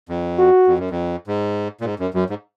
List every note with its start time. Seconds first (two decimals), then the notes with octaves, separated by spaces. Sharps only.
0.09 F2
0.39 F#4
0.67 F2
0.78 F#2
0.90 F2
1.27 G#2
1.81 A#2
1.85 G#2
1.99 F#2
2.14 F#2 F#3
2.30 G#2